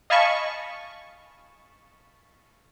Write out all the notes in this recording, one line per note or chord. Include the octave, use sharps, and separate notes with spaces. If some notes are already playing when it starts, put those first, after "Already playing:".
D#5 F5 G#5 A5 B5 C#6